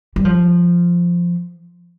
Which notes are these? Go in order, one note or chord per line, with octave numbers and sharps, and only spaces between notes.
G3
F3